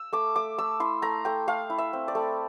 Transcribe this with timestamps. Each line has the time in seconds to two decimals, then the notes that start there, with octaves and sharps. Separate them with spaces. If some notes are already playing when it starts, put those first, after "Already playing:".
Already playing: E6
0.13 A3 D6
0.36 A3 D6
0.58 A3 E6
0.80 E4 C6
1.02 A3 A#5
1.25 A3 G5
1.48 A3 F5
1.70 E4
1.78 E5
1.93 C4
2.08 D5
2.15 A3